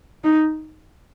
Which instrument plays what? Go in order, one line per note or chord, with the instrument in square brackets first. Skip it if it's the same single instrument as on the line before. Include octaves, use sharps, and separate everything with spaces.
[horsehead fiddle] D#4